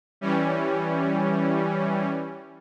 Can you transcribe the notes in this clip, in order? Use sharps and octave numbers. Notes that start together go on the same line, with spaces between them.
E3 G3 C#4